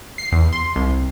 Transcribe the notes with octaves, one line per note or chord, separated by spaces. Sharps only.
C7
E2
C6
C2